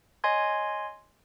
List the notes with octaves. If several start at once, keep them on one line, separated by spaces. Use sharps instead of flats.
C#5 D#5 G#5 C6 G#6